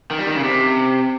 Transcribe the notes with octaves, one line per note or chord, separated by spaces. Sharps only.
D#3
G3
D#3
C#3
C3